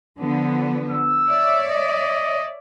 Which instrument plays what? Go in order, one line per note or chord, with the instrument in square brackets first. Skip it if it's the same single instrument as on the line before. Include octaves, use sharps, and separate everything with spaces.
[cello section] D3 F3 B3
[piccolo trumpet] E6
[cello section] C#5 D5 E5
[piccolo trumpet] D#5